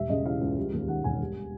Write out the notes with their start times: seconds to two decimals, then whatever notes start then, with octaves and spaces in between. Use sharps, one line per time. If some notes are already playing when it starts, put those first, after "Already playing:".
Already playing: E1 G3 E5
0.09 C#3 D#5
0.25 E3 F5
0.41 C#2
0.57 G3
0.73 D#2
0.88 D#3 F#5
1.04 E1 G#5
1.20 G3